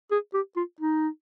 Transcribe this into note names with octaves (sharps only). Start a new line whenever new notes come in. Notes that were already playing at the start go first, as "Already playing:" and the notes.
G#4
G4
F4
D#4